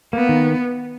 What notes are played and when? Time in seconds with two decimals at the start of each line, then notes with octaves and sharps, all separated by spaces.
0.13 A#3 B3
0.29 D#3